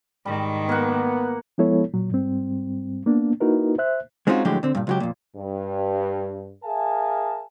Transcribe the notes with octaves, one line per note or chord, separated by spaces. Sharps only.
G#2 D#3 G3
A#3 B3 F#5
F3 G#3 B3 E4 A4 C#5
A#2 F#3
G#2 G3 C4
A#3 B3 D4
A#3 D#4 E4 F#4 A#4 B4
C5 E5 F#6
G#3 C4 C#4 D#4 F4 F#4
A2 D3 F3 F#3 G#3 G4
D3 C4
G2 A#2
C#2 F#3 G4
F2 A#2
G2
G#4 A#4 E5 F5 G#5 A5